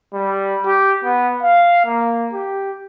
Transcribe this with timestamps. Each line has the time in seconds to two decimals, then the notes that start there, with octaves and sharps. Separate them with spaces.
0.14 G3
0.66 G4
1.04 B3
1.43 F5
1.85 A#3
2.33 G4